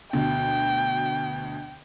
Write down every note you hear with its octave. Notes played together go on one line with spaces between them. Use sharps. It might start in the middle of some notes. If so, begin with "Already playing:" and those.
D2 B2 G5